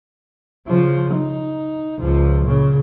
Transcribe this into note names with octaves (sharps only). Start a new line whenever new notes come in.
C#3 F3
D#4
C#2 F3
A#2 C#3